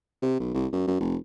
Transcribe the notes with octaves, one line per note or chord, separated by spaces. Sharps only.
C3
B1
C2
F#2
F#2
F1